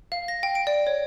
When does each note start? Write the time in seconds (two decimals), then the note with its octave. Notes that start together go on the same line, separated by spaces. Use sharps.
0.12 F5
0.28 A#6
0.43 G5
0.55 D7
0.67 D5
0.87 C#5